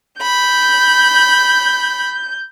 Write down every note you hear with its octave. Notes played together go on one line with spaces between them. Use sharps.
B5 G6